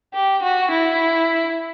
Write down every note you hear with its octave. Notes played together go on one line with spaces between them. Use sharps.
G4
F#4
E4